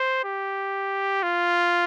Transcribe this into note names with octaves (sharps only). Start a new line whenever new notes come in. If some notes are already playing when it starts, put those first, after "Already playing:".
Already playing: C5
G4
F4